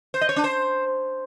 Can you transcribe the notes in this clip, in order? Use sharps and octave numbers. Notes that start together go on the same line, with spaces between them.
C5
D#5
C#5
D4
C5